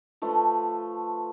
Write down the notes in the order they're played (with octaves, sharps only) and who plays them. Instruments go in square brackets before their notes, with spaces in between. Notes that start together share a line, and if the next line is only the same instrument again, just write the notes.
[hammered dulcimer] F3 A3 F4 B4